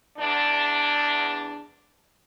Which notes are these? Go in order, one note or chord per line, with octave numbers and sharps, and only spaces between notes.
E2 D4